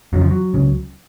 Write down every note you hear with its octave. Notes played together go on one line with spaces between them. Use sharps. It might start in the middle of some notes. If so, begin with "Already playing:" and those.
F2 C#3 F#3
F3
F#3
C#2 C#3